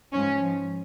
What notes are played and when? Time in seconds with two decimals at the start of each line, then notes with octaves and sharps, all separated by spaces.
0.12 G#2 F3 C#4